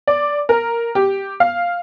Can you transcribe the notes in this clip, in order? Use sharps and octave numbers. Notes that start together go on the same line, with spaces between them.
D5
A#4
G4
F5